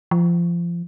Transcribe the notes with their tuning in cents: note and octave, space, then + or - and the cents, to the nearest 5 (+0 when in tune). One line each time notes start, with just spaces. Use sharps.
F3 -25